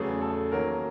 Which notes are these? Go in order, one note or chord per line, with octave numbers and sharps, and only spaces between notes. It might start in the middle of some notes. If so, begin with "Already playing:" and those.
Already playing: E2 C#3 F#3 A3 G#4
A4
D#3 F#3 A#3 C#4 A#4